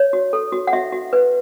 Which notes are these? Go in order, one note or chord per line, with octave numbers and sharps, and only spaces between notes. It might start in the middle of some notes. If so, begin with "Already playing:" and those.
Already playing: C#5
F#4
A4
F#4
F#5
F#4 E5
F#4
B4